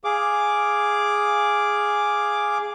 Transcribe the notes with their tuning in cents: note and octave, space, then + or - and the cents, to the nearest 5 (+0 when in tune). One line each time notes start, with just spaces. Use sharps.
G#4 +0 F5 +0 D6 +0